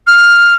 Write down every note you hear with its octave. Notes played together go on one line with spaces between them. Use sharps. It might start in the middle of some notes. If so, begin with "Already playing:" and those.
F6